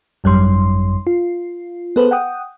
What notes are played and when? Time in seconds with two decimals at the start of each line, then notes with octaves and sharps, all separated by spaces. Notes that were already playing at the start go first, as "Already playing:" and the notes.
0.24 G#1 F#2 G3 C6
1.07 F4
1.96 B3 G#4 A4 B4 C5
2.11 F#5 G5 D#6